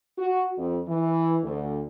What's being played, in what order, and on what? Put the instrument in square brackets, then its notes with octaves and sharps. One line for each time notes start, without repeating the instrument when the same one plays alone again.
[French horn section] F#4
F2
E3
D2